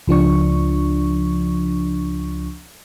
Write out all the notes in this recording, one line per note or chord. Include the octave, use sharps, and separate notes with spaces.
C#2 F3 D4 C#6